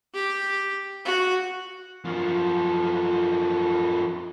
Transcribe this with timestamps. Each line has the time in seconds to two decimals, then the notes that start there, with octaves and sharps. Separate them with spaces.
0.14 G4
1.05 F#4
2.05 F#2 F3